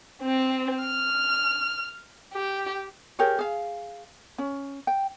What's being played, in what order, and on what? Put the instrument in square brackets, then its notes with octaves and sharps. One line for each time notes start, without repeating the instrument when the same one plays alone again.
[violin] C4
F6
G4
[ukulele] G4 G#4 A#4 C#5
G#4 F5
C#4
G5